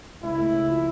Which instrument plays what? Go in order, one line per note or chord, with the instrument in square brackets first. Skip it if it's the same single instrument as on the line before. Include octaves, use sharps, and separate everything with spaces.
[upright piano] C#2 [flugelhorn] E4
[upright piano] A3
C#3
F3